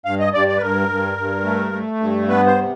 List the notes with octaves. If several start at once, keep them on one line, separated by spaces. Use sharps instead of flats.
G2 F5
D#5
G2 D5
D5
B4
G2 A#4
G2
G2
A3
A3
G2
B3 B4
C5
C3